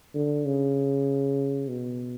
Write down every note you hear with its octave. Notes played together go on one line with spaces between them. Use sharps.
D3
C#3
B2